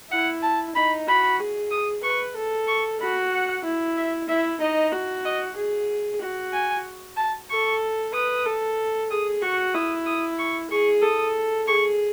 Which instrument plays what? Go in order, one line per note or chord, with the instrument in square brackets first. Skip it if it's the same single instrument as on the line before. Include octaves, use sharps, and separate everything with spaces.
[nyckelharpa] E4 [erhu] F#5
[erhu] A5
[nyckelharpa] D#4 [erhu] B5
[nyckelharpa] F#4 [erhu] B5
[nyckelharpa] G#4
[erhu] D#6
[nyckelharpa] B4 [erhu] C#6
[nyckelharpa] A4
[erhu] C#6
[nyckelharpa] F#4 [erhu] B5
[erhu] F#5
[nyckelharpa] E4
[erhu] E5
[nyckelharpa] E4 [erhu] E5
[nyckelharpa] D#4 [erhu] D#5
[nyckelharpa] F#4
[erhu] D#5
[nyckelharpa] G#4
F#4
[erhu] G#5
A5
[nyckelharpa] A4 [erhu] C#6
[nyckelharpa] B4 [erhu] D#6
[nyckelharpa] A4
[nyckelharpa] G#4 [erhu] D#6
[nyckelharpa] F#4 [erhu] C#6
[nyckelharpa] E4 [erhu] D#6
[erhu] D#6
C#6
[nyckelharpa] G#4 [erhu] C#6
[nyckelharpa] A4 [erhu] D#6
[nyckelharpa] G#4 [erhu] C#6